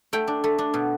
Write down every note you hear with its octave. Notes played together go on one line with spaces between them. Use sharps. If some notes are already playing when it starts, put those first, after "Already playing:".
A3 G5
D4
A3
D4
B2